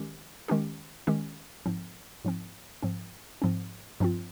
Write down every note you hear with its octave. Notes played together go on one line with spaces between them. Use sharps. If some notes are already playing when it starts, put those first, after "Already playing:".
Already playing: D#3 G#3 C#4 G4
D#3 G#3 C#4 G4
D#3 G#3 C#4 G4
G#2 F3 C4
G#2 F3 C4
G#2 F3 C4
G#2 F3 C4
G2 F3 C4 F4